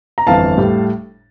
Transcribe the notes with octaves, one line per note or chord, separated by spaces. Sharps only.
A#5
G1 F2 E3 F5 A5
A2 G3